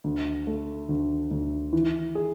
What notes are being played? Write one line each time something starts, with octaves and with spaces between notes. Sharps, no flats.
D2
A3
D2
D2
E3
G#4